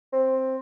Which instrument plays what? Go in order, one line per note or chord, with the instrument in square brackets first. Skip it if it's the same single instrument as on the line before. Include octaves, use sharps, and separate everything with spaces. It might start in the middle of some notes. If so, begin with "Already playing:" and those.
[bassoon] C4